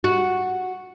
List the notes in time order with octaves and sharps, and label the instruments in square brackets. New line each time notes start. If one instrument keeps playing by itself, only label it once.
[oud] F#4